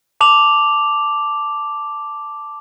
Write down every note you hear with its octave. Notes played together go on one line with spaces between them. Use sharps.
A5 D6 F7 F#7